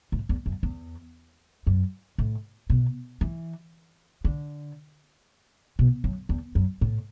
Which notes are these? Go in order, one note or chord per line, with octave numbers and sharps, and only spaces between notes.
A2
E2
F#2
E2
F#2
A2
B2
E3
D3
B2
F#2
E2
F#2
A2